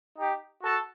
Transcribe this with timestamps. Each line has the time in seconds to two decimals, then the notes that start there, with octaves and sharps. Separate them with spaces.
0.17 D#4 G4
0.62 F#4 A4